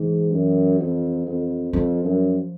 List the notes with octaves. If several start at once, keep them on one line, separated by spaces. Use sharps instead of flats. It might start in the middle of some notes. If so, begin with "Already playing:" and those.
Already playing: G#2 E3
F#2
F2
F2
F2 F3
F#2